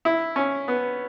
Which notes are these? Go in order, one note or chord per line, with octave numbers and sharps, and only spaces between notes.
E4
C#4
B3